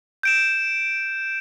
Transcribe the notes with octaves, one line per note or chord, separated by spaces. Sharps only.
G6 D7 E7